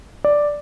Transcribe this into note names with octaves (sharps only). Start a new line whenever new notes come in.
D5